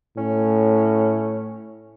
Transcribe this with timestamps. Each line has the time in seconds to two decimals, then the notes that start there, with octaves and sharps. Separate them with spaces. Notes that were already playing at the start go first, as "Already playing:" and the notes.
0.17 A2 C#4